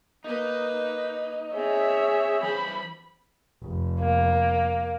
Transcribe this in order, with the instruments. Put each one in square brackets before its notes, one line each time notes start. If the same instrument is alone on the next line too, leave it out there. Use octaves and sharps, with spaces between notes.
[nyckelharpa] A#3 B4 [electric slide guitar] D#4
[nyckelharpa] C4 [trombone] G#4 [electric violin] C#5 E5
[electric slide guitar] E3 C5 [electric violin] B5
[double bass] F1
[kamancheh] A#3